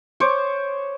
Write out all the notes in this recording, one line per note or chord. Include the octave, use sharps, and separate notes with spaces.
C5 C#5 C#6 D6